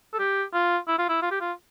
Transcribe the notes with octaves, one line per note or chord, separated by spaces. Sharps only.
A4
G4
F4
E4
F4
E4
F4
G4
F4